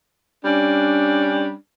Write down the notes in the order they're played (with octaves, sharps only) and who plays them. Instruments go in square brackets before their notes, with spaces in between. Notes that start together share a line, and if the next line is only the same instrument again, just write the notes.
[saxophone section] G3 C#4 D4